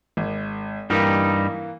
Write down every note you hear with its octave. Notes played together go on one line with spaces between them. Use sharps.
G#1
G2 E3 G3 A#3 D#4